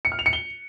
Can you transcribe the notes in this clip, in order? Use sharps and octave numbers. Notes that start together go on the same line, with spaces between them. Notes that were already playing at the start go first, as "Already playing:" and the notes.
C#7
F6
F7
C#7
G7